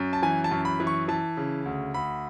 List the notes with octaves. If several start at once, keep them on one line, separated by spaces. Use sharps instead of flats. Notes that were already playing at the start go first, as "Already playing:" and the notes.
Already playing: F#2
A5
E3 G#5
A5
F#2
B5
E3
C#6
E3 A5
C#3
D2
D2 B5